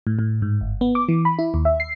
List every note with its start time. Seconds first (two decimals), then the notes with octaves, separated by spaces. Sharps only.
0.07 A2
0.19 A2
0.42 G#2
0.61 G1
0.81 B3
0.95 D6
1.09 E3
1.25 B5
1.39 E4
1.54 D#2
1.65 E5
1.80 C7